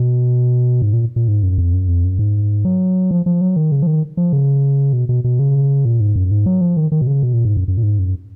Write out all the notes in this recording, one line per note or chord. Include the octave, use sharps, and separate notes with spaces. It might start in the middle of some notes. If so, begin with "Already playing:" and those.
Already playing: B2
G#2
A#2
A#2
G#2
F#2
F2
F#2
F2
F#2
G#2
F#3
F3
F3
F#3
D#3
C#3
F3
D#3
F3
C#3
B2
B2
B2
C#3
A#2
G#2
F#2
G#2
F#3
F3
D#3
D#3
B2
C#3
B2
A#2
G#2
F#2
F#2
A#2
G#2
F#2